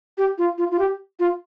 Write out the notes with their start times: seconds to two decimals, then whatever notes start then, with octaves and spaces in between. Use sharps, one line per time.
0.18 G4
0.38 F4
0.58 F4
0.71 F4
0.79 G4
1.19 F4